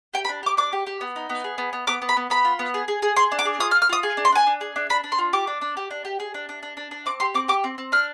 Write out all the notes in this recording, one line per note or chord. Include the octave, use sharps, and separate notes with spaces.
G4 G5
B5
D4
G4 D6
D4 D6
G4
G4
B3
D#4
B3
G#4
B3
B3
B3 D6
B3
B5
B3
B3 B5
F4
B3
G#4
G#4
G#4
G#4 C6
D4
D6
G#4
F4 D#6
F6
F4
F6
F4 D#6
G#4
D4
C6
D4 G#5
D4
G#4
D4
D4 B5
D4
C6
F4
G4 D6
D4
D4
G4
D4
G4
G#4
D4
D4
D4
D4
D4
C4 D6
G4 C6
C4 D6
G4 D6
C4
C4
D4 F6